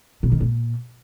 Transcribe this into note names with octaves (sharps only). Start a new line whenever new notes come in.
B2
D#3
A#2